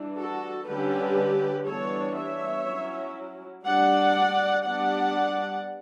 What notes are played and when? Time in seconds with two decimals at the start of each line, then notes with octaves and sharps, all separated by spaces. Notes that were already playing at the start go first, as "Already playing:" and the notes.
Already playing: E3 G3 D4
0.19 F#4 A4
0.68 D3 G3 C#4 G4 B4
1.67 E3 G3 B3 D4 A4 C#5
2.17 C#5 E5
2.66 F#3 C#4 E4
3.65 G3 D4 D5 F#5
4.64 G3 B3 D4 D5 F#5